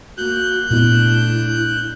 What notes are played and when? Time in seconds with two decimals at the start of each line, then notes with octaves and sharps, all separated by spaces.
0.17 A#3 F#4 F#6 G6
0.71 A#2 A3 B3 D4 E4